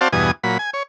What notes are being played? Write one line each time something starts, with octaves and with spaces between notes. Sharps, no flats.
C4 F#4 C5 D5 F5 A5
E2 G2 B2 G#5 D#6
A#2 F#3 B5
G#5
C#5